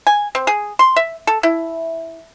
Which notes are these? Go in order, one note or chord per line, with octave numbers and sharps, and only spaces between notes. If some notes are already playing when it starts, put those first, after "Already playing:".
G#5
C4
G#4
C6
E5
A4
E4